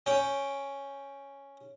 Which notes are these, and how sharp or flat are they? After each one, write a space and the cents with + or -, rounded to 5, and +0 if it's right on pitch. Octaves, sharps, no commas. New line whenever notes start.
C#4 +0 G5 +0